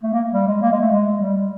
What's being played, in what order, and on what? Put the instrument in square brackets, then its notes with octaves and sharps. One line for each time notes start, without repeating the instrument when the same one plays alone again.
[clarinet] A3
A#3
G3
G#3
A#3
G#3
A3
G#3
G3